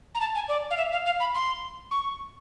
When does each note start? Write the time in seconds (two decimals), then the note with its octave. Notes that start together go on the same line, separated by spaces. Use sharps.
0.14 A#5
0.20 A5
0.35 G#5
0.48 D5
0.70 F5
0.77 E5
0.92 F5
1.06 F5
1.20 B5
1.34 C6
1.91 C#6